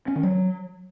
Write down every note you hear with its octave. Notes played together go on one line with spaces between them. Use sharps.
C#4
D#3
F#3